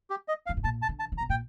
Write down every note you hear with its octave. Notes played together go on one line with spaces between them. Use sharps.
G4
D#5
F5
G2
A2
A#2 A5
A5
D3
A5
D3
A#5
C3
A#2 G5